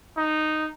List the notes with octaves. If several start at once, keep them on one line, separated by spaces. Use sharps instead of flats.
D#4